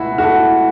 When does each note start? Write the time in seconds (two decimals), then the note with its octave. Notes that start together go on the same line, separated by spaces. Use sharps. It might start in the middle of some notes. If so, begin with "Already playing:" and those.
Already playing: C#2 B2 A3 E4 F#4
0.18 F#4
0.23 E4 A4